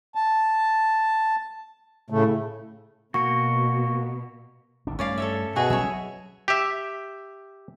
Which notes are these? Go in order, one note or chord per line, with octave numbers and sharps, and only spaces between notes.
A5
A2 C#3 A3
B2 A#3 F#4 C#6 C#7
G#1 D2 D4
G2 A3 C#4 D5 F5
A4 C#5 E5
B2 F#4 G#4 E5
F#3 G3 C#4 C#5 E5
G4 E5